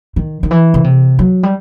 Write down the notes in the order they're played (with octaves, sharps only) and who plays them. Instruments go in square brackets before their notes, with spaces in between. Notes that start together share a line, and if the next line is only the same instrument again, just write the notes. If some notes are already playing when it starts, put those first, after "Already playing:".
[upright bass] D#3
D#3
E3
C#3
C3
F#3
G3